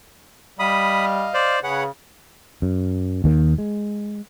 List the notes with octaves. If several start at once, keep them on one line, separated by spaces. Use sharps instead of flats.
G3 D#5 F5 B5 D#6
C5 D5
C#3 G#4 B4 C#5 F#5
F#2
D#2 D#3 A#3
G#3